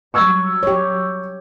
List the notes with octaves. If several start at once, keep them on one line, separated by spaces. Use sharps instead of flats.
F#3 G3 C#6 E6 G#6
G4 C#5